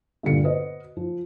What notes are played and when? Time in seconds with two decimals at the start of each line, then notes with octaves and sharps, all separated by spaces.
0.23 G2 A#2 D3 A4 C#7
0.44 F#4 B4 C5 D#5
0.97 F3